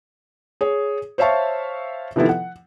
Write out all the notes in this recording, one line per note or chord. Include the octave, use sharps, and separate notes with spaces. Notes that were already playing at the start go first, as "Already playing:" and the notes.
G#4 C#5
C5 C#5 E5 F5 A5 C#6
C3 D#3 F3 B3 E4 A4
F#5